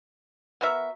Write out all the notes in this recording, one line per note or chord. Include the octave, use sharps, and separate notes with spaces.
B3 F#4 A#4 E5